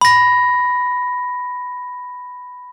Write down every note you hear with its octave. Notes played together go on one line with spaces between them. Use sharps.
B5 A#6